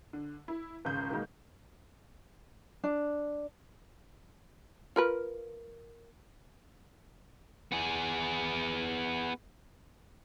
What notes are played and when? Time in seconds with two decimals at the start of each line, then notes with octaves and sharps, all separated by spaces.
0.13 D3
0.48 E4
0.85 G#1 C#2 C#3 G6
1.10 B2 D#3 G#3 A#3
2.84 D4
4.96 F4 A#4 B4
7.72 B3 G#4